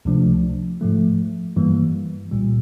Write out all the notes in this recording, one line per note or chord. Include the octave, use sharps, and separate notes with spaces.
C#2 C3 F3 A3 D4
G#2 F3 A3
G2 E3 G3 A#3
C2 A#2 G3